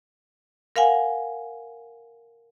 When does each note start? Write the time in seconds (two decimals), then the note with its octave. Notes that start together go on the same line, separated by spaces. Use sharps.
0.76 A#4 F5 F#5 G#5